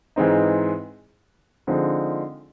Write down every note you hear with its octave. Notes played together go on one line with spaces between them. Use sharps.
G#2 E3 G#3 C4 D#4
D3 F3 G#3 C4 D#4